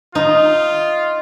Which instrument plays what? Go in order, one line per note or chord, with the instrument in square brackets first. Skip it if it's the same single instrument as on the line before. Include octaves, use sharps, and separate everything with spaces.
[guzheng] D#4 [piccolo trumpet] F4